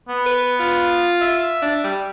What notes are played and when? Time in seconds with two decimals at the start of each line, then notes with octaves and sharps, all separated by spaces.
0.09 B3
0.26 B4
0.59 F4
1.21 E5
1.62 D4
1.84 G3